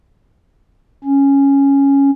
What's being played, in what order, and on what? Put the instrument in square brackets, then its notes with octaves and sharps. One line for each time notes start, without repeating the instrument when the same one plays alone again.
[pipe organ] C#4